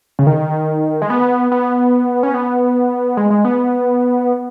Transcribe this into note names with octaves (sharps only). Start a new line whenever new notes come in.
C#3
D#3
G#3
B3
B3
C#4
B3
G#3
G#3
B3